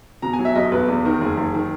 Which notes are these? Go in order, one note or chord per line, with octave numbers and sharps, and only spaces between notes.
B2 A#5
G#5
F#3
E5
B1 D#5
B1 B4
E2
D#3 A#4
F#1 G#4
F#1
D#3